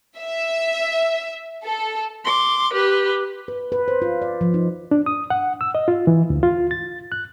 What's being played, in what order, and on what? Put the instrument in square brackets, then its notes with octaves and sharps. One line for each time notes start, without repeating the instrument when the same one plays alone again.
[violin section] E5
A4
[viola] C6 D6
G4 B4
[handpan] B4
B4
C5
F4
D5
F3
D#4
[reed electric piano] D4
D#6
F#5
E6
D#5
F4
E3
D2
F4
A6
F#6